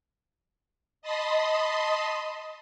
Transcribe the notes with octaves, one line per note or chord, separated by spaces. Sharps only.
D#5 A5 B5 C6 D#6